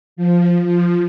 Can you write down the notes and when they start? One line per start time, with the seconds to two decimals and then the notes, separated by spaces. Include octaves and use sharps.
0.16 F3
0.64 F3